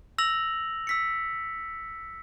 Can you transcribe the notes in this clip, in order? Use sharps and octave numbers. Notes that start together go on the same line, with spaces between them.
E6 A#6 F7 F#7
E6 B6 C#7